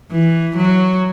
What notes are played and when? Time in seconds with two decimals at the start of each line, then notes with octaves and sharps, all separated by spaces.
0.11 E3
0.57 F#3